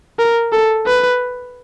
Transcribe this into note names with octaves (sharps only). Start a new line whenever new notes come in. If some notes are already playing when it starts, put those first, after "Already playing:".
A#4
A4
B4